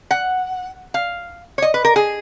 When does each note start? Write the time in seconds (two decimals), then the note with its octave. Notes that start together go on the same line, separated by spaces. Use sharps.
0.11 F#5
0.94 F5
1.58 C#5
1.62 D#5
1.74 B4
1.85 A#4
1.96 G#4